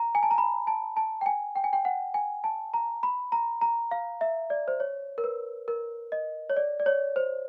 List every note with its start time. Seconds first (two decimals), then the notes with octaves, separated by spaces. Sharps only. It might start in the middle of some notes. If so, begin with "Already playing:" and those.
Already playing: A#5
0.15 G#5
0.23 A5
0.31 A#5
0.38 B5
0.67 A5
0.97 A5
1.21 G5
1.26 G#5
1.55 G5
1.64 G#5
1.73 G5
1.85 F#5
2.14 G#5
2.44 A5
2.74 A#5
3.03 B5
3.32 A#5
3.61 A#5
3.91 F5
4.21 E5
4.50 D5
4.68 C5
4.80 C#5
5.18 A#4
5.24 B4
5.68 A#4
6.12 D#5
6.50 C#5
6.56 D5
6.80 D5
6.86 C#5
7.16 C5